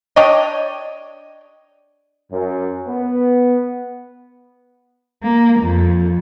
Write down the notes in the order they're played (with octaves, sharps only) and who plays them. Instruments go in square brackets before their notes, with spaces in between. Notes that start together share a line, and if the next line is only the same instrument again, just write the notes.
[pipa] D4 G4 C#5 D#5
[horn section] F#2
B3
[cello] A#3
F2